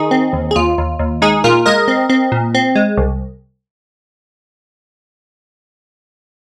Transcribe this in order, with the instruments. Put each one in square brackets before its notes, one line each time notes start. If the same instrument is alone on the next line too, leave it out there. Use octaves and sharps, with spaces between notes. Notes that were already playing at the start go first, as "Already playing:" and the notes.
Already playing: [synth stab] D#3 D#4 G#4
C4
D#2
G#4
D#2 F4
D#2
D#2
G#3 D#4 G#4
A#2 F4 A#4
G#3 A#4 D#5
C4
C4
A#2
C4
G#3
C2